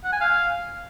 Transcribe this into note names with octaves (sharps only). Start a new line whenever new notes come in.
F#5
G#5
F5